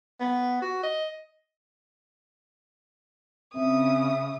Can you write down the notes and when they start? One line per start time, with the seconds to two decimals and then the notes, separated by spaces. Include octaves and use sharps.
0.20 B3
0.62 F#4
0.83 D#5
3.56 C#3 C4 E5 D#6